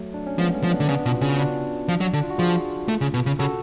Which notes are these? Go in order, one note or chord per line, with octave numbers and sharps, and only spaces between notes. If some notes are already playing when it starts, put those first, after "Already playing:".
Already playing: F#3 A3
D4
C#4
F3 G#3 B3
A3 C#4
F3
B3 D4
D3
C#3 B3 D4
B2 C#4 F4
F#4
C#3 C#4 F4
D4 F#4
F3
F#3
D3 D4
F4
F#4
F3 F4 G#4
A3
C#3
B2
C#3
C#3 F#4 A4